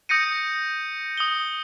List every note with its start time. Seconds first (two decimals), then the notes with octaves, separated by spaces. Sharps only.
0.09 D#6 G6 A#6 C#7 D#7
1.17 D#6 G7